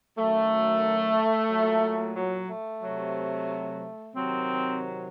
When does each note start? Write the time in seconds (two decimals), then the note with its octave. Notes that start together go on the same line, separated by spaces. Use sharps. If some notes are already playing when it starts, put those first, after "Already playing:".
0.17 F#2 D#3 F#3 A3
1.50 A#2 F#3
2.16 F#3
2.49 A3
2.82 C3 F#3
4.14 C3 D#3 F#3 C4